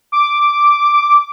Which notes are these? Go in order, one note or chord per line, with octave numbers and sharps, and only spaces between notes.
D6